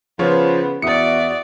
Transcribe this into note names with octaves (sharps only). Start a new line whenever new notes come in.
C#3 F3 B3 F4 C5 C#5
E2 F#4 D5 E5 D#6 C#7